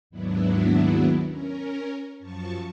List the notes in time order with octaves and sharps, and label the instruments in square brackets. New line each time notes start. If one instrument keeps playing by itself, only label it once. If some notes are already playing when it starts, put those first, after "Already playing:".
[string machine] D#2 G#2 F#3 B3 D4 E4
C#4 A#4
F#2 F3 A5 C#6